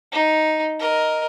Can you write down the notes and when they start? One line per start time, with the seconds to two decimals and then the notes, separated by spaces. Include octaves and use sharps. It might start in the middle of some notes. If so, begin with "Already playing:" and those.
0.12 D#4
0.79 A#4 D#5